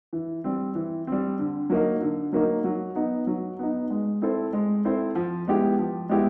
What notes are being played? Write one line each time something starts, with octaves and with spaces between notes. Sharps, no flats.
E3
G3 C4
E3
G3 C4
D3
F#3 A#3 D#4
D3
F#3 A#3 D#4
F#3
B3 D#4
F#3
B3 D#4
G#3
C4 E4 A4 C5
G#3
C4 E4 A4 C5
F3
G#3 B3 E4 G4
F3
G#3 B3 E4 G4